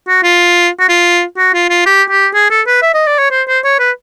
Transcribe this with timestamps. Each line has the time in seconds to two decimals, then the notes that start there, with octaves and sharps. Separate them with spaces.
0.09 F#4
0.24 F4
0.80 F#4
0.89 F4
1.38 F#4
1.54 F4
1.70 F4
1.86 G4
2.11 G4
2.35 G#4
2.51 A4
2.67 B4
2.82 E5
2.94 D#5
3.07 D5
3.19 C#5
3.31 C5
3.48 C5
3.65 C#5
3.80 B4